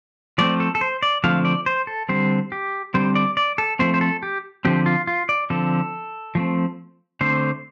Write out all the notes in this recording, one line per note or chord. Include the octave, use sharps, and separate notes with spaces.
F3 A3 C4 D5
A4
A4
C5
D5
D3 F3 A3 C4 F5
D5
C5
A4
D3 G3 C4 C5
G4
D3 G3 C4 C5
D5
D5
A4
F3 A3 C4 C5
C5
A4
G4
D3 F3 C4 G4
F4
F4
D5
D3 F3 C4 A4
F3 A3 C4
D3 A3 C4 C5